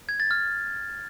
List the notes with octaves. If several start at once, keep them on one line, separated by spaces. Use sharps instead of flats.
G#6
A6
F6